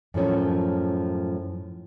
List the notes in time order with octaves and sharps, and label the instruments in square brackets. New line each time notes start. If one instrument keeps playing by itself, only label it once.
[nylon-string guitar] F#2 A2 F3 C#4